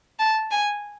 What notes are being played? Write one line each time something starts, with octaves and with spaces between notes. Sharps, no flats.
A5
G#5